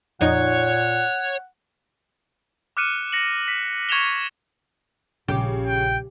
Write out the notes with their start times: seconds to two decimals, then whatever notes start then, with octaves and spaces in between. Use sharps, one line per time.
0.21 F2 A#2 D#4 C#5 F#5
2.77 D6 F6 F#6 C#7 D#7 E7
3.12 A#6 C#7 F#7
3.48 B6
3.89 C#6 G#6 C#7 E7 F7 G7
5.28 A#1 C#3 G4
5.66 G5